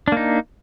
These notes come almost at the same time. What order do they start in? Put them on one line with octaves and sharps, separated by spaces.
D4 A#3 D#4